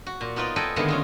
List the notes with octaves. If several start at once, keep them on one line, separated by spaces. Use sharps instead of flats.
F#4
A#2
B3 D#4 F4 B4 D5
A4 B4 D5 D#5 G5 G#5
D3 D#3 G#3 A#3 B3 E4
C#4 F4 G#4